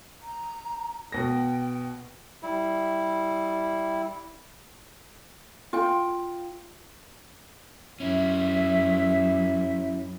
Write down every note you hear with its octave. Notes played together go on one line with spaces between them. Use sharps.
A#5
B2 G5 A#6
G3 E4
F4 G5
F#2 C#4 E4 E5